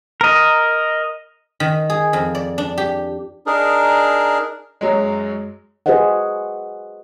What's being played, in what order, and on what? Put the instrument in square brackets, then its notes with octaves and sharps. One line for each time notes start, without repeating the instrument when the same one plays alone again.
[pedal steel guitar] A#4 D#5
[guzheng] D#3
G#4
F2
D5
D4
G4
[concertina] D4 D#4 G#4 A#4
[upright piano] F#2 F#3 G#3
[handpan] F#4 G#4 B4 C5 D#5 F#5